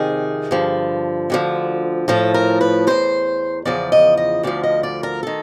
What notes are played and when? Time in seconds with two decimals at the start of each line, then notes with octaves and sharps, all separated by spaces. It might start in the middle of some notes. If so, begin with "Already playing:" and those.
Already playing: F2 C3 D#3 G#4
0.51 G2 D3 F3
1.30 D2 D3 F3
2.08 A2 F3 A4
2.34 A#4
2.61 B4
2.87 E2 B2 C5
3.65 E2 C#3 F3 D5
3.92 D#5
4.17 D#5
4.43 D2 D3 F3 D5
4.63 D#5
4.83 D5
5.03 A#4
5.23 D#3 A4